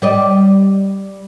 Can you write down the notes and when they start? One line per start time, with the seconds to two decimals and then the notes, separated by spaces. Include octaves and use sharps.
0.02 G3 D5 D#5